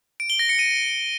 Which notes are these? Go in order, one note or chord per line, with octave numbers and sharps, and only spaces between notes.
D7
G7
A#6
C#7
D#7